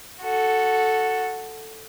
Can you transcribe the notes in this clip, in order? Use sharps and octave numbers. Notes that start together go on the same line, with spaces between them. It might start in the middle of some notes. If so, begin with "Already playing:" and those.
F#4 A4